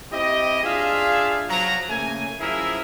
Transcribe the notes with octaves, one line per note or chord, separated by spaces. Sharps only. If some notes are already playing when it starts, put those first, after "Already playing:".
C4 E4 G4 D#5
D4 F4 G#4 E5 F5
F3 F#3 A#5
C#3 A3 A#3 G#5
F#2 F3 E4 G#4 A#4 E5